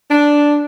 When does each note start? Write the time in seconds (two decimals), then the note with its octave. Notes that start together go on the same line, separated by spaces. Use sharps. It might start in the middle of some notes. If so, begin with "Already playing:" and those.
0.10 D4